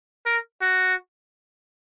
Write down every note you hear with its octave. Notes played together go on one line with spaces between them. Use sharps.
A#4
F#4